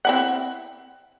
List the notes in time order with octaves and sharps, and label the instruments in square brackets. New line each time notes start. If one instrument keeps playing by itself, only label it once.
[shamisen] C4 E4 F#5